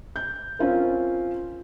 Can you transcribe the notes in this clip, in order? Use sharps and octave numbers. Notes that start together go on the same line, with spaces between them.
G6
C4 C#4 F4 A#4